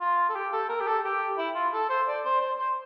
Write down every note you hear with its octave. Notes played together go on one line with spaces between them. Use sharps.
F4
A4
G4
A4
A#4
G4
A4
G4
E4
F4
A4
C5
D5
C5
C5
C5